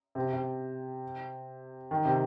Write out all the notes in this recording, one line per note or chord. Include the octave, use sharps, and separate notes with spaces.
C3
C3
D#3
C3